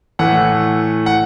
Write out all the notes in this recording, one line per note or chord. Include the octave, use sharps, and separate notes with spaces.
A2 E3 A3 F#5
F#5